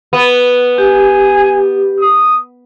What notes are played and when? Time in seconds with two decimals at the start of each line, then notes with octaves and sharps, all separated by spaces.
0.13 B3
0.78 G4 G#5
2.00 D#6